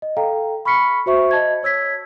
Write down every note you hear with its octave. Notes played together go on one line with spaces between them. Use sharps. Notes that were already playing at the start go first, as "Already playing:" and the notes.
D#5
A4 F5 G5 A#5
B5 C#6 F6 B6 C#7
F#4 C5 E5 C#6
D#5 A5 G#6
C#5 E6 G#6 B6